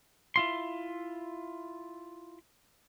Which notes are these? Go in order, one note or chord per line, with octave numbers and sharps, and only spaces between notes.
E4 F4 C6